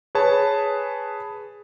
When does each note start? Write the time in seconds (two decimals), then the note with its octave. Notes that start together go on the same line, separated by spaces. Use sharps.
0.15 G#4 B4 C#5 A5